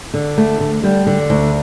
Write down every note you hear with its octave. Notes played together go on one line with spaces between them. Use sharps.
D3
D2 A3
D3
D3 G3
D3
D2